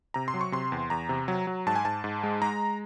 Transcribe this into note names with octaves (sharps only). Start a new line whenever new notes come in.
C3 A#5
C6
F#3
C#6
C3 C6
E2
E2 A#5
C3
F#3
F#3
G#2 A5
G#5
G#2 A5
G#2
G#3
G#3 A#5